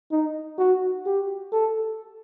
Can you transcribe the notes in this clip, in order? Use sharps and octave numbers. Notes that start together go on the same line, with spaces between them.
D#4
F#4
G4
A4